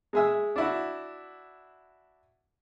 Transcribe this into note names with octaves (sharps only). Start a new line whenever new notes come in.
G#3 G#4 E5
D4 E4 F#4